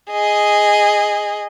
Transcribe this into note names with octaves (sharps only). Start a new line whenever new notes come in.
G#4 D#5